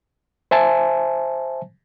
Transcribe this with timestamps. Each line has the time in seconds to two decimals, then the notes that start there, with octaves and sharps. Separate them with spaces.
0.51 C5 E5 G#5 A5